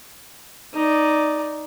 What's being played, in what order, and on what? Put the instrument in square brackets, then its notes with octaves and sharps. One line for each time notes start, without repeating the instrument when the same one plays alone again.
[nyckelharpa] D#4 D5